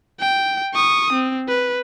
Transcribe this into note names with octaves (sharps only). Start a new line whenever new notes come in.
G5
C#6 D#6
C4
B4